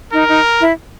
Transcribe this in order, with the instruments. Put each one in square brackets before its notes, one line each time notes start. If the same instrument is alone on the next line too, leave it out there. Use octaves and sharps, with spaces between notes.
[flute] D#4 [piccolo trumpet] A#4
[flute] D#4
E4